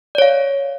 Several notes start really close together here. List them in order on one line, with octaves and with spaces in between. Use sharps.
D5 C#5 F5